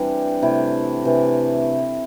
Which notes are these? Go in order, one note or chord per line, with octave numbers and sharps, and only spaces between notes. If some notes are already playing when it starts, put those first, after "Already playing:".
Already playing: E3 G3 C4 D4 G4
C3 A3 E4
C3 E3 A3